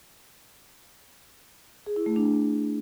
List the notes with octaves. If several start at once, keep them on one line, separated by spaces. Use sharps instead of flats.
G#4
E4
A3
D4